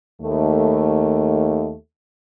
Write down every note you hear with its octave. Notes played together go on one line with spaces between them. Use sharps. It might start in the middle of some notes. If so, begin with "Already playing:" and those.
D#2 A3